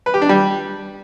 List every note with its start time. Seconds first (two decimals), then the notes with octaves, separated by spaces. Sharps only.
0.06 B4
0.14 G4
0.22 D4
0.29 G3